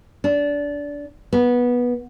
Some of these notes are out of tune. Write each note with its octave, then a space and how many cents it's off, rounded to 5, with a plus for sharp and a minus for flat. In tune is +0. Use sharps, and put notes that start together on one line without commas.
D4 -20
B3 -15